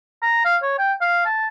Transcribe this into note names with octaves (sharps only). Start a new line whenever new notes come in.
A#5
F5
C#5
G5
F5
A5